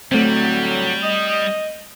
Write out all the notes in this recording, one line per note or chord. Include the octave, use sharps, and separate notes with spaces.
A2 D3 F#3 G3 A3 C4
D#5